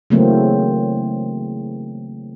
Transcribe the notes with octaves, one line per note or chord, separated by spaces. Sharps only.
C#3 E3 F#3 A3 A#3 C4